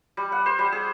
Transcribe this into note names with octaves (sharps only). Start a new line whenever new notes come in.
G3
F#5
C5
G3
G#4